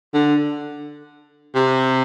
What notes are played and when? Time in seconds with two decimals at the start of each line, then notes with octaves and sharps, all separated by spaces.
0.14 D3
1.55 C3